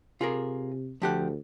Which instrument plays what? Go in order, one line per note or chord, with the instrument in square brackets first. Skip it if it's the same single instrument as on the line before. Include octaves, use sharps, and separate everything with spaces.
[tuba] C3 [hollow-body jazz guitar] F4 G#4 A#4
[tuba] D2 [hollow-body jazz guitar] F3 G4 F#5